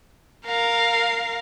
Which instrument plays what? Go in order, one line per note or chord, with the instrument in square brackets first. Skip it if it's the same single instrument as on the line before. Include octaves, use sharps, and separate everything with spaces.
[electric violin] A#4 F5